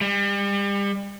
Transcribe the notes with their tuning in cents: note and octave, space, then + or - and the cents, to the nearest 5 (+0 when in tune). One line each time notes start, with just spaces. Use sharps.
G3 +35